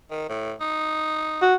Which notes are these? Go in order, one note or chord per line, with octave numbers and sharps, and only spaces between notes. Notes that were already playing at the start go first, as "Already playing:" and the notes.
D#3
A2
D#4
F#4